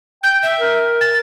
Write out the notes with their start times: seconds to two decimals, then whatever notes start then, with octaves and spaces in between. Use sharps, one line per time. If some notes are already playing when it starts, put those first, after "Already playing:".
0.24 G5 G6
0.43 E5
0.59 A#4
1.01 A6